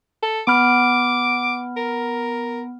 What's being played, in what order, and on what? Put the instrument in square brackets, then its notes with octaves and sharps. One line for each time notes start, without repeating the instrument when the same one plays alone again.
[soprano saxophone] A4
[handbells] B3 B5 F6 [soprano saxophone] D6
[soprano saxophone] A#4